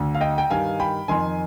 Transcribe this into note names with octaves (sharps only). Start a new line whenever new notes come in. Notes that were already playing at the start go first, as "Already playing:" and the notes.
Already playing: D2 D3
F5
D#5 G5
G5
G2 D#3 F5 G#5
G5 B5
F2 D#3 G#5 C6